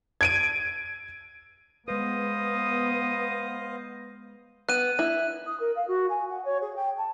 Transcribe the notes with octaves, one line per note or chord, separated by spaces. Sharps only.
G#6 D7 D#7
G#3 B3 B4 C5 D#5 F5 D#6
B3 F#6 D#7
E4
D#6
A#4
F5
F#4
G#5
F#5
C#5
G#4
G5
A5